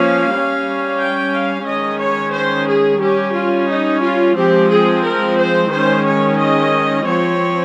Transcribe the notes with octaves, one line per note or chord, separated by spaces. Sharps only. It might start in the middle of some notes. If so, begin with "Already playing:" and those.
Already playing: F3 A#3 C#4 F5
G3 C#4
G5
F5
D#3 G#3 C#4 D#5
C#5
C5
G#4
G3 C#4 G4
F4
D#4
F4
F3 G#3 C4 G4
G#4
A#4
C5
D#3 G#3 C#4 C5
C#5
D#5
F3 C4 C#5